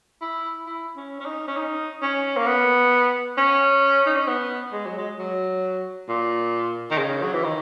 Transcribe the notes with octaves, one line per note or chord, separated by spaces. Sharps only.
E4
E4
C#4
C#4
D#4
C#4
D#4
C#4
A#3
B3
C#4
D#4
C#4
B3
G#3
F#3
G#3
F#3
A#2
D#3
C#3
F#3
E3
D#3